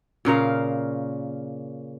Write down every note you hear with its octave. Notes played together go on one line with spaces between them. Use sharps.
A#2 C#3 A#4 F5